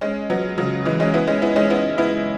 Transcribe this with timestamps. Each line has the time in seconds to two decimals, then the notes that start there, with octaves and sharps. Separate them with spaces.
0.01 G#3 C#4
0.30 F#3 B3
0.58 C#3 F#3
0.85 E3 G#3
1.00 G#3 C#4
1.14 B3 E4
1.27 G#3 C#4
1.42 B3 E4
1.56 G#3 C#4
1.70 B3 E4
1.98 B3 E4